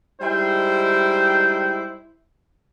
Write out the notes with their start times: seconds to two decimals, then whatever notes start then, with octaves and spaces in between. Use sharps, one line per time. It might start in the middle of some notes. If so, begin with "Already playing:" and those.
0.20 G3 G#3 D#4 E4 C5 G5